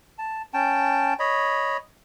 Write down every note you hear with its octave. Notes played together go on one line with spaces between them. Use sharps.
A5
C#4 G5 A5
C#5 D#5 B5